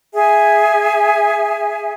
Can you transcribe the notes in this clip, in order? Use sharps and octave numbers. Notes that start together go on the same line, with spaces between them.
G#4 E5 G#5